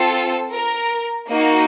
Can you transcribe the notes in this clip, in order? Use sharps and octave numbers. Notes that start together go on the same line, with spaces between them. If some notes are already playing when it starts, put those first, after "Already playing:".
Already playing: C4 F4 A4
A#4
A#3 D#4 F#4